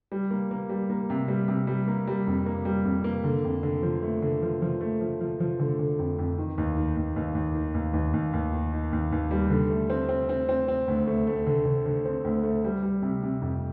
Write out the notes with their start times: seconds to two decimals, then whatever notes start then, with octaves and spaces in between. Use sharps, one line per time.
0.12 G3
0.31 A#3
0.51 A#3
0.69 G3
0.90 A#3
1.10 C3
1.28 G3
1.48 C3
1.67 G3
1.88 A#3
2.07 G3
2.27 F2
2.46 A#3
2.65 G3
2.85 F2
3.04 A#3
3.24 D3
3.44 F2
3.63 D3
3.83 F3
4.03 A3
4.22 D3
4.42 F3
4.62 F3
4.81 A3
5.01 F3
5.21 F3
5.40 F3
5.60 D3
5.79 D3
5.99 F2
6.19 F2
6.38 D#3
6.58 D#2
6.77 D#3
6.96 D#2
7.16 D#2
7.35 D#2
7.55 D#3
7.74 D#2
7.94 D#2
8.13 D#2
8.33 D#2
8.53 D#3
8.73 D#3
8.92 D#2
9.12 D#2
9.31 G3
9.50 D3
9.70 A3
9.90 C4
10.09 C4
10.29 C4
10.49 C4
10.68 C4
10.88 D2
11.07 A3
11.27 A3
11.47 D3
11.65 D3
11.86 D3
12.05 C4
12.24 D2
12.44 A3
12.64 G3
12.83 G3
13.02 C3
13.23 C3
13.42 F2